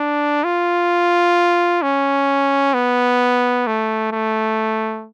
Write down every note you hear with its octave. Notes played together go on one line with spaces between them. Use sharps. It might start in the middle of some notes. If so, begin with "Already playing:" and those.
Already playing: D4
F4
C#4
B3
A3
A3